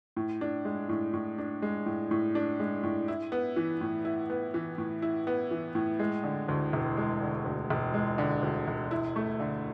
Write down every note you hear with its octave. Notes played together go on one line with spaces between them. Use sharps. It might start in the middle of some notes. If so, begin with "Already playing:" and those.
A2
D4
G#3
A2
A2
D4
G#3
A2
A2
D4
G#3
A2
E4
B3
E3
A2
E4
B3
E3
A2
E4
B3
E3
A2
G#3
D3
D2
E1
G#3
D3
D2
E1
G#3
D3
D2
E1
E4
A3
D3